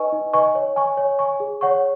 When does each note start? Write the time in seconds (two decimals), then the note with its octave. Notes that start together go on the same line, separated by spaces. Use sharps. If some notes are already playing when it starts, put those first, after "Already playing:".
Already playing: D#4 B4 D#5 G#5 C#6
0.12 D#4
0.33 B4 D#5 G#5 C#6
0.55 C#5
0.76 G#5 C#6
0.97 C#5
1.19 G#5 C#6
1.40 G#4
1.61 C#5 F#5 C#6